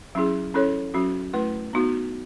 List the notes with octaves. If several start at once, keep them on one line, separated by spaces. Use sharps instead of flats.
F#3 C#4 E4 G#4
C#4 E4 A4 C#5
F#3 C#4 F#4
A3 E4 B4
B3 D#4 F#4